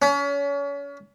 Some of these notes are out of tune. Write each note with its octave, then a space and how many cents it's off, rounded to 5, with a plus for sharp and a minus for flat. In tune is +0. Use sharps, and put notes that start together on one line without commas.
C#4 +35